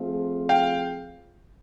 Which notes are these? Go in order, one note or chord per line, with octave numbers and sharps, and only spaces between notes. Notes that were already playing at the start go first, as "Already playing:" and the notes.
Already playing: F3 A3 C4 F4 G#4
F5 G5